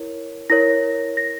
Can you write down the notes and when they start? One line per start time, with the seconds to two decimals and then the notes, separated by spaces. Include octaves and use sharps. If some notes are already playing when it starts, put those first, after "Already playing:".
Already playing: E4 A#4 C#5
0.50 E4 A#4 C#5 A#6
1.17 A#6